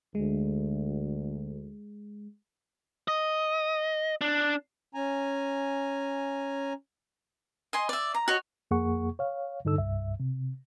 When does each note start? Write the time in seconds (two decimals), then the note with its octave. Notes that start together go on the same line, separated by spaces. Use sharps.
0.15 D2 G#3
3.08 D#5
4.21 D4
4.95 C#4 G#5 A#5
7.73 D#5 G#5 C6
7.89 D5 E5
8.14 A#5
8.28 F#4 C#5 D#5
8.71 F2 A#3 G#4 F#5 C#6
9.19 C#5 F5
9.65 G2 D3 D#4 A4 E6
9.78 C2 G2 E5
10.20 C3